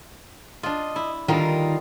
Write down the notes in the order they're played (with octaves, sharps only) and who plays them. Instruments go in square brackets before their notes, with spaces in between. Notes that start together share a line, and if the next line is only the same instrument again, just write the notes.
[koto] D4 F4 [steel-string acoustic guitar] D#5
[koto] E4
[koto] D3 G3 [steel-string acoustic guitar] D#3 F4 A#4